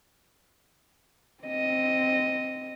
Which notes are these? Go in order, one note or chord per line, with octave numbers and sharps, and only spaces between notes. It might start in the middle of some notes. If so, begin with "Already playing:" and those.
C4 D#5